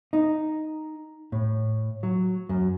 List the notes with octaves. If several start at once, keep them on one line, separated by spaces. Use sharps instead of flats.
D#4
A2
F#3
F#2